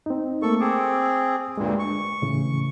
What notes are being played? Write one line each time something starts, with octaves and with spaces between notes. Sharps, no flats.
C4 D#4
A3 A#3 A4 C#6
C4 G#4 D6 E6
D2 G2 A#2 G#3
C#6
A2 C#3 E3